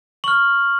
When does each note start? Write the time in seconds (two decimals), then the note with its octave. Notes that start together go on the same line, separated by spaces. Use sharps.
0.24 C#6 F6 F#7